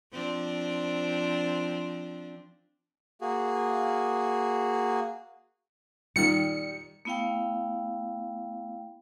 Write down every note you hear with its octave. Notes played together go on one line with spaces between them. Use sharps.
F3 C4 D4
A#3 F#4 G#4
A#2 D#3 G3 C#7
A3 B3 E4 F5 G5